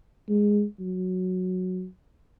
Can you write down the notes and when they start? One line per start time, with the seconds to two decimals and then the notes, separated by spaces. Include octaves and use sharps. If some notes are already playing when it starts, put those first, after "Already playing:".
0.29 G#3
0.80 F#3